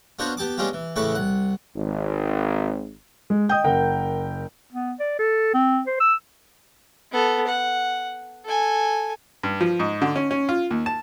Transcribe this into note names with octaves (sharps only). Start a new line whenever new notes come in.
B3 D4 F4 F#4 C5 C#5
B3 G4 A5 D6
G#3 B3 C#4 D4 F4 G4
E3
A2 C#3 E3 B4 C#6 D6
C2 F#5
G#1
G#3
D#5 G5 D#6 G6
F#1 A#4 F#5 G5
B3
D5
A4
C4
C5
E6
B3 A4
F#5
A4 G#5
G2
F3
G#2
D3
C#4
C#4
F4
D#2
A5